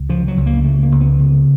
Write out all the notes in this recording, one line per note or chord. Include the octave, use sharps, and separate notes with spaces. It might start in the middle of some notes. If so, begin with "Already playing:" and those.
Already playing: C#2
C#3 F3
F#3
C#2
A#3
C#3 A3
A#3
C#2
B3
C#3